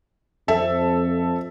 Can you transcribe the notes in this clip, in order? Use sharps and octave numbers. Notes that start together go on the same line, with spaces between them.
F2 A4 E5